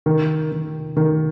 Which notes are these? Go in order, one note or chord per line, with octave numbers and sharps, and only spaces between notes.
D#3
D#3
D#3